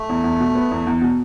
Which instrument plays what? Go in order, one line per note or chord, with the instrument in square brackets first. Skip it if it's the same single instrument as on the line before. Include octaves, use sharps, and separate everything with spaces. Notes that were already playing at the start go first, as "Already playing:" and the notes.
Already playing: [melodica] A3
[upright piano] E2
E2
B2
B3
E2
E2
B2